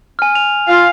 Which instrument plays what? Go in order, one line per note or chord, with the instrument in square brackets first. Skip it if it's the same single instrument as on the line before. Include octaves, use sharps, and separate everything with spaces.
[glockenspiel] G#5 F6
F7
[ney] F4 [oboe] F5